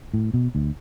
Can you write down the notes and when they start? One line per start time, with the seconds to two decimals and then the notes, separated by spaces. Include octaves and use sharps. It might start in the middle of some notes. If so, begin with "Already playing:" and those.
0.14 A2
0.34 B2
0.55 D2